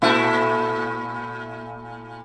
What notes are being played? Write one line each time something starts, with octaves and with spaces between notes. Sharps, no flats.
A#2 A3 E4